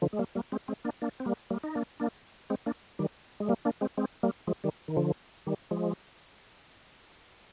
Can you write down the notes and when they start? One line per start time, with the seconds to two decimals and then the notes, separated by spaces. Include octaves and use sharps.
0.02 D3 F3
0.13 G#3
0.19 G3 A#3
0.35 G3 A#3
0.52 G#3 C4
0.68 G#3 C4
0.85 A#3 D4
1.02 A#3 D4
1.20 C4
1.26 G3 A#3
1.51 G3 A#3
1.64 D#4
1.75 A#3 D4
2.00 A#3 D4
2.50 G#3 C4
2.66 A#3 D4
2.99 D#3 G3
3.40 G#3
3.48 G3 A#3
3.65 A#3 D4
3.81 G#3 C4
3.98 G#3 C4
4.23 G3 A#3
4.47 F3 G#3
4.64 D#3 G3
4.88 D#3
4.96 D3 F3
5.47 D#3 G3
5.71 F3 G#3